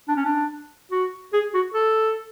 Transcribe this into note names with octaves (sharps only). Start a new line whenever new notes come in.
D4
C#4
D4
F#4
G#4
F#4
A4